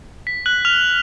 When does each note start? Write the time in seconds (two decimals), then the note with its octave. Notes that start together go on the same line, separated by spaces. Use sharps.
0.27 B6
0.46 F#6 F#7
0.65 F6 F7